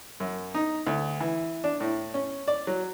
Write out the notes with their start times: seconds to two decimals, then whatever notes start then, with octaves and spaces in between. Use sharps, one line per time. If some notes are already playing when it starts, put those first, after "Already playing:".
0.20 F#2
0.54 D#4
0.87 D2
1.20 E3
1.64 D4
1.80 A2
2.14 C#4
2.48 D5
2.67 F#3